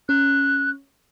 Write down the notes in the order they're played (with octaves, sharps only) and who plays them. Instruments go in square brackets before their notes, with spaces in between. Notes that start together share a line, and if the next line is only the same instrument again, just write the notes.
[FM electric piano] C#4 [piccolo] F#6